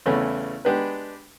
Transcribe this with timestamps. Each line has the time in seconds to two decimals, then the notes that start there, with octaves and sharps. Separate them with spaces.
0.06 E2 C#3 E3 A3 C#4
0.65 G#3 B3 D4 G4 B4